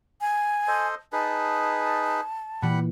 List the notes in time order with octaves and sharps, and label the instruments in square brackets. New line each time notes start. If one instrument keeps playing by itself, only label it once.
[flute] G#5
[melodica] A4 C5 D#5
[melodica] D#4 G#4 B4 [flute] A5
[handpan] A#2 E3 [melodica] G3 F#5 B5